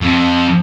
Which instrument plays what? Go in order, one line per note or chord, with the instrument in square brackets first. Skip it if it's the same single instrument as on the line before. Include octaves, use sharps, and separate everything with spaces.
[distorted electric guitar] F2